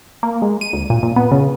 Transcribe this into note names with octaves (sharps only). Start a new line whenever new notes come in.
A#3
G#3
D#7
D2
A#2
A#2
B3
C#3